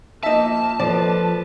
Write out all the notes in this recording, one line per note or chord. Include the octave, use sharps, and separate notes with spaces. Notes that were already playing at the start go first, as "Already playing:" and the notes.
F3 A#3 D#4 E5 A5
F3 A4 B4 D5